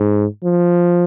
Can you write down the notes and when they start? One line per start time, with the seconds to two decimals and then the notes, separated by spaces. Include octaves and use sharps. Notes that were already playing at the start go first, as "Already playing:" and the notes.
Already playing: G#2
0.44 F3